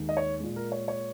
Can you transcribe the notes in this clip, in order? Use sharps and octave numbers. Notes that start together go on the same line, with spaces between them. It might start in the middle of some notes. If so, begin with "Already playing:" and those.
Already playing: D#2 D#3 G#3
D#5
C#5
A#2 G#3
A#4
C#5
C#5